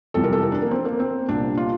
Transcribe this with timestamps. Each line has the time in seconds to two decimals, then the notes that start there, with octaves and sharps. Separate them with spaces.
0.14 F2 C3 E3 G3 A4
0.24 A#4
0.33 A4
0.43 A#4
0.52 D4
0.62 A#3
0.71 C4
0.85 A#3
1.00 C4
1.28 C2 A#2 G3 D4
1.57 F4